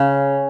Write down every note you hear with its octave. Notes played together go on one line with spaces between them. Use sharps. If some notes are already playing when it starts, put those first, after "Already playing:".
Already playing: C#3